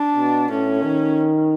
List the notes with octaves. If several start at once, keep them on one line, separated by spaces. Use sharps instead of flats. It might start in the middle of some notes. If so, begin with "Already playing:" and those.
Already playing: D4
B2
A2 C#4
D#3